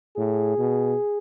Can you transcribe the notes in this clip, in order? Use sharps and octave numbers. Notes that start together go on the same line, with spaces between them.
A2 G#4
B2